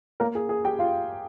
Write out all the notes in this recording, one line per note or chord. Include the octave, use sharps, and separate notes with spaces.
A#3 A#4
G#4
G#4
G4 G5
F4 F5